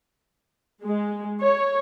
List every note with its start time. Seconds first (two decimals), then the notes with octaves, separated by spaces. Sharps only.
0.85 G#3
1.40 C#5